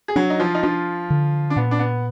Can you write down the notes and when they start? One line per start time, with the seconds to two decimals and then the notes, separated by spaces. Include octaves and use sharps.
0.08 G#4
0.16 F#3 D4 F#4
0.30 D#4
0.40 F3 F4
0.55 D#4
0.63 F3 D4 F4
1.10 D3
1.50 D4
1.56 A#2 B3
1.71 D4
1.79 B3